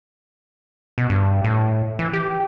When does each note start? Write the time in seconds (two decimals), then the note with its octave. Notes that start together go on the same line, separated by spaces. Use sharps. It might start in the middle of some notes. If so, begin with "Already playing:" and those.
0.98 B2
1.10 G2
1.44 A2
1.99 E3
2.13 G4